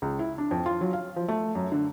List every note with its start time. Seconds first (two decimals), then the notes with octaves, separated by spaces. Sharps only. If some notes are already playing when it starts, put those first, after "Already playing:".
0.02 C#2
0.19 E4
0.38 D4
0.51 F2
0.66 F4
0.81 F#3
0.93 F5
1.16 F3
1.28 A3
1.55 F#2
1.72 D3